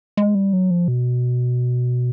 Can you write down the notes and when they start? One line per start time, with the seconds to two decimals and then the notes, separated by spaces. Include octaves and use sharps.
0.17 G#3
0.35 G3
0.53 F#3
0.71 F3
0.88 B2